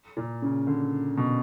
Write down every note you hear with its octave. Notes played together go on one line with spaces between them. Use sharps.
A#2
C#3
D3
B2